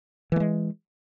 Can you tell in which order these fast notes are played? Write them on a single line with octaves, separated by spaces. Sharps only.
E3 A3 G#3